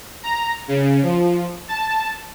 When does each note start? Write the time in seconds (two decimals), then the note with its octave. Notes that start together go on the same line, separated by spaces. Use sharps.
0.23 A#5
0.68 C#3
1.03 F3
1.68 A5